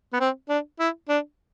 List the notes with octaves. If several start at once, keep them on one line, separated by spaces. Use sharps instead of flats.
B3
C4
D4
E4
D4